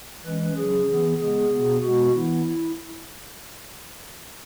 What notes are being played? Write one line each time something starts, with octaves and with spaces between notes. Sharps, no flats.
E3 G#3 C#4 B4
C#3 F#3 C#4 G#4
E3 B3
C#3 G#3 B3 G#4
B2 B3
B2 G#3 B3 F#4
E3 B3 E4